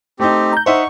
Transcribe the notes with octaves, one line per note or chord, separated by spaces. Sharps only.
A3 C4 D#4 G4
A#5 G6
D#4 C5 E5 F#5 C#6